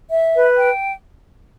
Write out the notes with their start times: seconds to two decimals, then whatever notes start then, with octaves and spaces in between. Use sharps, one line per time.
0.09 E5
0.34 B4
0.57 G5